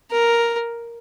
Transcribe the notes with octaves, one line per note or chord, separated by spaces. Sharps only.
A#4